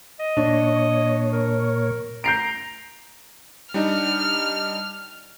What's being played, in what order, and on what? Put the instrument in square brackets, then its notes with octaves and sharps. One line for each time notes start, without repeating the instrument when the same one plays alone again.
[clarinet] D#5
[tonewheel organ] A#2 C#5 [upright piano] D4
[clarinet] A#4
[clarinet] A#5 [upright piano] G6 C7 D7
[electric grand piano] G3 D4 D#4 [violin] F6